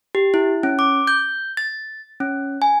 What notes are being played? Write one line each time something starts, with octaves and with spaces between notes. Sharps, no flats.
G4
E4
C#4
D6
G6
A6
C#4
G#5